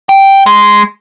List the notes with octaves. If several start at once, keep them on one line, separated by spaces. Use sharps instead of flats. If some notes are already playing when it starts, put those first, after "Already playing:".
G5
G#3